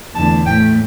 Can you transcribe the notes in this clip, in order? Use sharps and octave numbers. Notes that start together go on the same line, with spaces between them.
E2 D3 A3 A5
A2 A3 G5